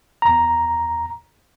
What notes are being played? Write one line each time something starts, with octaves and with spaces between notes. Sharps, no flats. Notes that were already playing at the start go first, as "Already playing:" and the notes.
E2 A#5